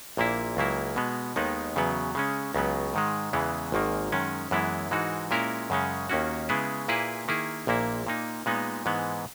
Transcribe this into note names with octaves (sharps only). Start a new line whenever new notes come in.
A#1 A#2 A#3 E4
C#2 C#3 F#3 A#3 E4
B2 G#3 B3
D#2 D#3 G#3 B3 D#4
E2 C#3 F#3 B3
C#3 G#3 C#4
C#2 C#3 F#3 B3
G#2 D#3 G#3
E2 C#3 E3 G#3 B3
G#1 G#2 D#3 A#3
F#2 D#3 G#3 C#4
F#2 E3 G#3 B3 E4
G#2 E3 G#3 D#4 F#4
A#2 G#3 C#4 E4 A#4
F#2 C#3 G#3 C#4
D#2 D#3 A#3 C#4 F#4
C#3 G#3 B3 E4 G#4
A#2 A#3 E4 G#4 B4
D#3 A#3 E4 G#4
A#1 A#2 A#3 E4
A#2 A#3 D#4
A#2 G#3 B3 D#4
G#2 E3 G#3 B3